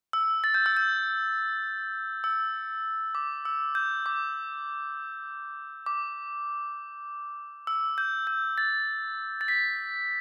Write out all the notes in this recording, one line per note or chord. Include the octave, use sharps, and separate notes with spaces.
E6
A6
G6
E6
G6
E6
D6
E6
G6
D6
D6
E6
G6
G6
A6
A6
B6